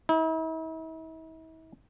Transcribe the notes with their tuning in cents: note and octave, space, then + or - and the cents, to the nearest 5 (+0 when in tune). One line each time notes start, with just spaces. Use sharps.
E4 -45